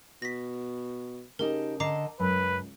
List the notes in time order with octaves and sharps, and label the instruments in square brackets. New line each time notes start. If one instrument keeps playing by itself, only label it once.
[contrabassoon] B2 [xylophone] A#6 B6
[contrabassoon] C#3 [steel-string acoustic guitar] D#4 G4 A5 [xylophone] A#4
[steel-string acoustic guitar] D3 D#5 A5 [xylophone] A#5 D6 C7
[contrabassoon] C#2 [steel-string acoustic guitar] F#2 [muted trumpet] B4